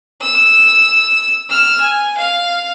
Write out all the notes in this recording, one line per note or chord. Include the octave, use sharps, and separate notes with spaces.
E6
E6 F6
G#5
F5